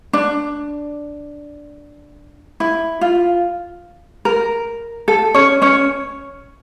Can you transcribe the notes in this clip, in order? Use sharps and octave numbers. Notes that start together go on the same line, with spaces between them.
D4
E4
F4
A#4
A4
C#4 C#5
C#4 C#5